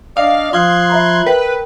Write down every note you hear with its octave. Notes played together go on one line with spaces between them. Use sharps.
D4 D5 D#5 F5
F3 F5 C6 D#6 F6 F#6 G#6
E5 A#5 B5
A#4 B4 G5